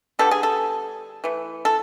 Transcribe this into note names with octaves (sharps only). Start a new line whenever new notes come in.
D3 G3 B3 A4
G#4
A4
E3 A3
A4